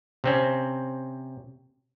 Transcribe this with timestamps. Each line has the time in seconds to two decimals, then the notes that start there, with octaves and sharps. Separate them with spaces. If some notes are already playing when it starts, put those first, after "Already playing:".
0.24 C3 C4 C#4